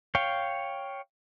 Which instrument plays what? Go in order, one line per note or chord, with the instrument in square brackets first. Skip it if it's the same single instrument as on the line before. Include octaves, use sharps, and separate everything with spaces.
[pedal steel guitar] C#5 F5 G5